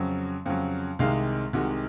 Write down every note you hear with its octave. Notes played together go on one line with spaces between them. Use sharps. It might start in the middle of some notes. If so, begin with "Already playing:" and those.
Already playing: F2 C#3 F#3
F2 C#3 F#3
C2 C3 D#3 G#3 F5
C2 C3 D#3 G#3 F#4